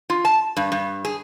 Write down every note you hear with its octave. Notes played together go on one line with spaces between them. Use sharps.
F4
A5
G2
G2
G#4